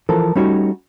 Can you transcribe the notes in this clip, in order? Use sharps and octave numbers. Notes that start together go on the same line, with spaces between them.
E3 F3 A4 A#4
G3 A3 C#4 D#4 F#4 C#5